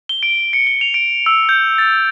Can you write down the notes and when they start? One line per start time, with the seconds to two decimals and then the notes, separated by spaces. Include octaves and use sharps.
0.09 G7
0.23 D7
0.53 C#7
0.67 G7
0.81 F7
0.94 D7
1.26 E6
1.49 G6
1.78 A6